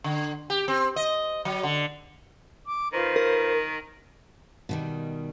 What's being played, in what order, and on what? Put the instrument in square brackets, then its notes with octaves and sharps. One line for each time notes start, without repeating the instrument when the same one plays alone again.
[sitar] D3
G4
C4
D#5
F#3
D3
[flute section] D6
[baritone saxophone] D#3 [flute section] F4 B4 C5
[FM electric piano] A#4
[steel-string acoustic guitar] B2 D#3 G3